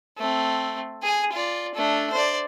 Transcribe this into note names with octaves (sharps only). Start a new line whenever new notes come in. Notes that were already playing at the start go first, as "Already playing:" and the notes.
A3 C4
G#4 G#5
F4 D5
A3 D4
C5 D5